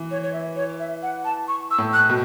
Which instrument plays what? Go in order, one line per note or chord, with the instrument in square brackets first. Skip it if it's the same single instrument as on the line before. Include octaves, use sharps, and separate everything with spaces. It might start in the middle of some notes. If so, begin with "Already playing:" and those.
Already playing: [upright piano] E3
[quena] C#5
C#5
E5
C#5
E5
F#5
A5
C#6
E6
[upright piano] A2
[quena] F#6
[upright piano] B2